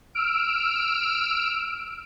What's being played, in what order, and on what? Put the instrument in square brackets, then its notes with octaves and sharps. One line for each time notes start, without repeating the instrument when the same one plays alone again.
[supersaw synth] E6 F6 D7